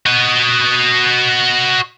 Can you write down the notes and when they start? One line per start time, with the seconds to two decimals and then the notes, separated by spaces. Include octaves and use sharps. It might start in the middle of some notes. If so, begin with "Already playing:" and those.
0.06 F#4 D#5